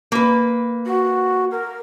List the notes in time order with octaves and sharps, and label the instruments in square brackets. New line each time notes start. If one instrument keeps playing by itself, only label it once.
[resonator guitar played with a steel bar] A#3 B4
[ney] F#4
A#4